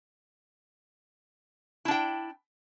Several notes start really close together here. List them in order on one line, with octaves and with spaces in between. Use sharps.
E4 D4 G5